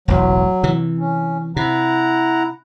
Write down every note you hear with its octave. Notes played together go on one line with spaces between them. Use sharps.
E1 A1 F#3
C3 E3
C#4
C3 E4 F#5 A#5